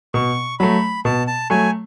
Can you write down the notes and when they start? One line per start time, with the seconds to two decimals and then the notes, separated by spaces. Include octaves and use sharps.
0.14 B2 C#6
0.59 F#3 A3 B5
1.05 B2 A5
1.27 A5
1.50 F#3 A3 G#5